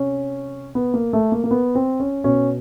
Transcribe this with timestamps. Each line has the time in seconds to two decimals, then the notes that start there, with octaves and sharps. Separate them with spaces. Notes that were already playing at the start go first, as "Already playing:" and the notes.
Already playing: C3 C#4
0.75 B3
0.94 A#3
1.13 A3
1.32 A#3
1.44 A#3
1.51 B3
1.75 C4
2.00 C#4
2.24 B2 C#4